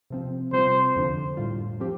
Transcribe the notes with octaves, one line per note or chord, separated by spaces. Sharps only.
C3 F3 C4
C3 G3 C4 F4 C5
F2 D3 F3 D4
A2 G3 F4
F3 C4 G4